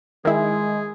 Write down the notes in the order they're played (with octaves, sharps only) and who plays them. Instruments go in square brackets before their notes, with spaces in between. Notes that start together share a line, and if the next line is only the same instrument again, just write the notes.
[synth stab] D#3 E4 [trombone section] G#3 [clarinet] G#4